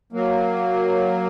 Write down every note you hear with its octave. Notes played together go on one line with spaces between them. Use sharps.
F#3 A#3